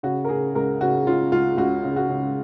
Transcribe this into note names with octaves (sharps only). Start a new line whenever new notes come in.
C#3 F#4
A#4
C#3 G#4
C#2 A#4
C#3 F#4
C#3 F4
C#2 F4
C#2 F#4
C#3
F#4
C#3